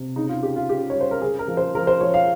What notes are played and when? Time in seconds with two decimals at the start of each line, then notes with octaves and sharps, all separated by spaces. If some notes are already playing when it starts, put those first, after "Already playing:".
Already playing: C3
0.16 C#3 D#4
0.29 F4
0.42 C#3 G4
0.56 F4
0.69 C#3 G4
0.90 C#5
0.95 G3
1.01 C5
1.11 A#4
1.21 C#3 G#4
1.39 A#4
1.48 F3
1.57 C5
1.75 F3 A#4
1.87 C5
2.01 F3 C#5
2.14 F5